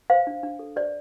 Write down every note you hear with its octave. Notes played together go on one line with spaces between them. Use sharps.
C5 F5
D4
D4
A4
C5 D5